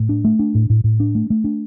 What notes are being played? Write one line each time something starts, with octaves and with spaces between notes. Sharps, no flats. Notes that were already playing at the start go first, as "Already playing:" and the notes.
Already playing: A2
D4
A3
D4
A2
A2
A2
D4
A3
A3
D4